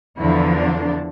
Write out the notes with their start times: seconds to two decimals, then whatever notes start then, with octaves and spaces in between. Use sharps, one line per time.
0.19 E2 D3 F3 E4
0.55 D4